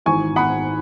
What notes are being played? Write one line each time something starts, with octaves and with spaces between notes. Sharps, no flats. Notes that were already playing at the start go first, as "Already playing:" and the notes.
G#1 G#2 E3 G#5 C#6
F#5 B5